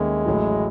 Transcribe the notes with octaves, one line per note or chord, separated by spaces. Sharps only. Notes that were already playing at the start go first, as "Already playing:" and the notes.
Already playing: D#2 D#3 G#3 A3 C#4 E4
A1 A2 F#3